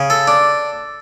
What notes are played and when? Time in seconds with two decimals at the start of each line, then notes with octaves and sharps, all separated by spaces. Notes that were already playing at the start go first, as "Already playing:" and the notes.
Already playing: C#3
0.10 A4
0.27 D4